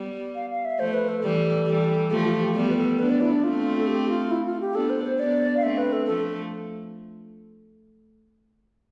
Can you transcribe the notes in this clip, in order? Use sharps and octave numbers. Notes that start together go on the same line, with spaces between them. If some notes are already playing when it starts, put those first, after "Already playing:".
Already playing: G3 B3
F5
F5
E5
F3 A3 C5
B4
A4
E3 G3
E3 G3
F3 A3 G4
F4
G4
G3 B3 G4
B4
A4
B3 D4 B4
D5
E4
D4
A3 C4 F4
A4
G4
F4
E4
F4
G4
B3 D4 A4
C5
C5
B3 D4 D5
F5
A3 C4 E5
B4
A4
F3 A3 A4